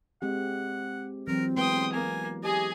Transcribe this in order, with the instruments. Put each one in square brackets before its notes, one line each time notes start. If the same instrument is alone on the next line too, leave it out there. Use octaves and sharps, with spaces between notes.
[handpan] G#3 C4 G4 [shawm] F#5
[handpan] E3 F#3 [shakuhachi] C4 [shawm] A#4
[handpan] G#3 B3 B4 [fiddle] G5 D#6 [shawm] C6
[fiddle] A#3 [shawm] G#5
[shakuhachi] G4 [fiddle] G#4 G#5 [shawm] D#5